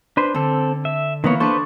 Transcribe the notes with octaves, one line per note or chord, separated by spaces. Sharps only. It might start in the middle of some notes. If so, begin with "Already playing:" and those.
D4 B4 C5
D3 C4 A4
E5
D#3 E3 A#3 B3 C#5
D4 A4 B4 C5 C#6